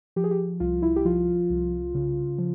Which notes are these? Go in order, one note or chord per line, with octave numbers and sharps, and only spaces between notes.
F3 G4
G#4
G4
C2 F4
E4
G4
F3 F4
C2
C#3
F3